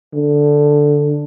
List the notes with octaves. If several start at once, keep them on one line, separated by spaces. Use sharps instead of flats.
D3